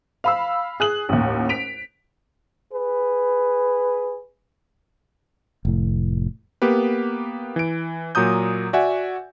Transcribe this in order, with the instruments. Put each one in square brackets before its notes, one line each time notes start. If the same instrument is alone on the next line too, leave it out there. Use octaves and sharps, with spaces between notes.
[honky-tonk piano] F5 B5 E6
G#4 F#6 F#7
A1 D#2
B6 D7 F7
[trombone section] G#4 B4
[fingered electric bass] F1 A2
[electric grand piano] A#3 B3 G4 B4
E3 D7
A#2 F#3 A#5 D#6 G6
F#4 D5 E5 F#5 G#5